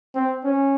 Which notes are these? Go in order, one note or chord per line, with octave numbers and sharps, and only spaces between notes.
C4
C#4